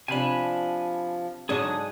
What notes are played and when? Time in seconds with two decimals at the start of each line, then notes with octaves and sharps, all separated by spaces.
0.08 C3 F3 D4 G#5 B5
1.49 G#2 D3 F#3 D4 G#4 D#6